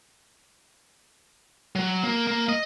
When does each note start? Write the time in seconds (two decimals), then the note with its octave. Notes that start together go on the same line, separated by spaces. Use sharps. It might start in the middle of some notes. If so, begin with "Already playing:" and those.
1.76 F#3
2.03 A#3
2.27 A#3
2.49 D#5